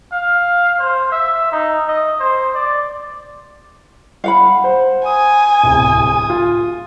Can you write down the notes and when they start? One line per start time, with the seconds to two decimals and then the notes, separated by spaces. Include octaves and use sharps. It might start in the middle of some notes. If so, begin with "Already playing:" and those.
0.12 F5
0.79 C5
1.12 E5
1.52 D#4
1.88 D#5
2.20 C5
2.54 D5
4.24 F5 F#5 B5
4.64 C5
5.06 G#5 D#6
5.64 D1 C2
6.30 F4